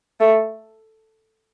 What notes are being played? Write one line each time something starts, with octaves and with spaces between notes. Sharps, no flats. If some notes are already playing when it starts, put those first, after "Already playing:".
A3